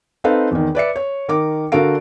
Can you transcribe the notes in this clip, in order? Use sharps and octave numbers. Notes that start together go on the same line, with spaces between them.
C4 D#4 A4 B4 F5
E2 D#3
B4 D5 E5 C#7
C#5
D#3 A#4 D6
D3 F#4 A4 A#4 F5 D7